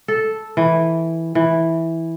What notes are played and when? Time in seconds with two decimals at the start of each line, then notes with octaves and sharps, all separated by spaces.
0.08 A4
0.57 E3
1.35 E3